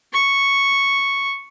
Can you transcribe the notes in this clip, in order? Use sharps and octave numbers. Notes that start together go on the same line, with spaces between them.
C#6